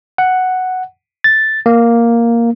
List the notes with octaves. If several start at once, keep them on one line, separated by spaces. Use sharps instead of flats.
F#5
A6
A#3